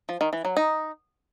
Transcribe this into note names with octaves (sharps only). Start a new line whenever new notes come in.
F3
D#3
E3
F#3
D#4